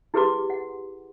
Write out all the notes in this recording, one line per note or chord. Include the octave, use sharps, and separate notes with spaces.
E4 G4 G#4 B4 C6 D6
F#5